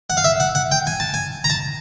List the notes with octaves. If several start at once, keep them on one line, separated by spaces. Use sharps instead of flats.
F#5
F5
E5
F#5
F#5
G5
G#5
A5
G#5
A#5
A5